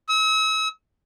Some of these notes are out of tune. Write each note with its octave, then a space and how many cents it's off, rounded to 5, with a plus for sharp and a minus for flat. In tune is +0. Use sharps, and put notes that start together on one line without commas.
E6 -40